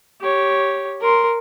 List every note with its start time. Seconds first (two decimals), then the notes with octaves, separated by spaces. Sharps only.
0.21 G4 C#5
1.01 A#4 C6